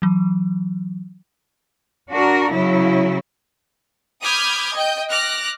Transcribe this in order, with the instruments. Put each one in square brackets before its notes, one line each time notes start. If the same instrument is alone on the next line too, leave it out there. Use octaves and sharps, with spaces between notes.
[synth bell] E3 F#3
[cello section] D4 F#4 A#4
C#3 F#3 E4
[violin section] B5 D6 D#6 F6 G6 G#6
D#5 G5 G6
D6 F6 F#6 A#6